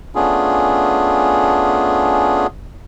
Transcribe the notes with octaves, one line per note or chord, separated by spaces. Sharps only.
A3 B3 C#4 D4 F4 G#4